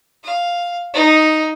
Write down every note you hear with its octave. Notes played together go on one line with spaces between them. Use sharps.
F5
D#4